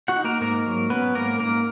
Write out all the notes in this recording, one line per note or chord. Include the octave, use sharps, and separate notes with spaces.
F#4 F#5
D#4
A#3 A#4
G#2 A#3 A#4
F#3
B3 C#4 B4
G#2 A#3 A#4
G#2 A#3 A#4